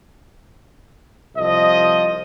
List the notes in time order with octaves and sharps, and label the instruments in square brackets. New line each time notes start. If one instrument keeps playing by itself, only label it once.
[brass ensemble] C2 F3 D#5